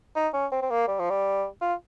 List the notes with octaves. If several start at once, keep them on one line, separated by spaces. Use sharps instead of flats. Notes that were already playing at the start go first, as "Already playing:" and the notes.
D#4
C#4
C4
C4
A#3
G3
F3
G3
F4